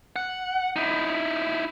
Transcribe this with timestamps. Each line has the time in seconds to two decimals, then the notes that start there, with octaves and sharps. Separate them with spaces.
0.16 F#5
0.76 D#4 E4